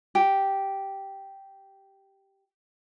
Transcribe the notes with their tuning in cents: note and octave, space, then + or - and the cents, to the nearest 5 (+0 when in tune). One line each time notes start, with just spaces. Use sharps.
G4 -5